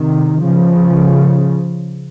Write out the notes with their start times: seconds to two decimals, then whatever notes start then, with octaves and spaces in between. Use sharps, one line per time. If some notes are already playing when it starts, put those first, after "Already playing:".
Already playing: C3 D#3
0.43 C#3 F3